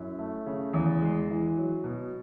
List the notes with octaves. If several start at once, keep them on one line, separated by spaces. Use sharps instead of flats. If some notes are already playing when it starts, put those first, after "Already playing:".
Already playing: F#2 E4
A3
C#3
E2
G#3
E3
F#3
B2